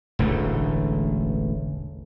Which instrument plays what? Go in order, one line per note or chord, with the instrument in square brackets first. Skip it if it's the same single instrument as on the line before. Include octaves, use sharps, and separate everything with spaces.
[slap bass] E1 A1 D3 A3